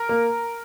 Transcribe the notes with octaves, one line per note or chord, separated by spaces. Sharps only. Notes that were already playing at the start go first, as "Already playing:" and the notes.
Already playing: A#4
A#3